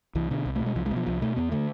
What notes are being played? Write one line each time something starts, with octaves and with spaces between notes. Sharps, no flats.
C2 E3
B2 D3
C2
A3
B2
G#3
C2 F3
G#3
B2
F3
C2 F3
B2 A3
E2 B3
D3 A3